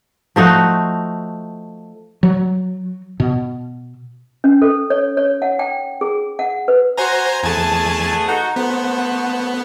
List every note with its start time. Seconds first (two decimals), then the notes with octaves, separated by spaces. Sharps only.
0.36 F3 A3 D#4 F#4
2.23 F#3
3.20 B2
4.44 C#4
4.62 A4
4.90 C#5
5.17 C#5
5.42 F#5
5.59 G5
6.01 G#4
6.39 F#5
6.68 B4
6.98 F#4 C5 G#5 A#5
7.43 E2 A3 B3 G#4 G#5 A5
8.28 D#4 F#4
8.56 A3 B3 F#4 C5